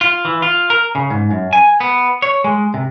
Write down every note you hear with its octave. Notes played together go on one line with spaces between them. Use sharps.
F4
E3
F4
A#4
C#3
G#2
F#2
G#5
B3
C#5
G#3
C3